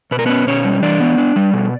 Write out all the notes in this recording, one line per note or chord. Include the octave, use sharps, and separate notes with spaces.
B2 B4
A#4
B3 C#4 B4
B2 C#4 C#5
G3
E3 D4 D5
B3
D4
G3
B2